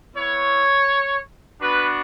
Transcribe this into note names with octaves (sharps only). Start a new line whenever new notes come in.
B3 E4 C#5
B3 D4 F#4 B4